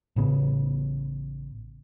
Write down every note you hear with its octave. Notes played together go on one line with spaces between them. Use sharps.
A1 A2 C#3 B3